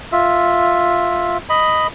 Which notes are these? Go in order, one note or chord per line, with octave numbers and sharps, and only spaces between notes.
F4 E5
D#5 B5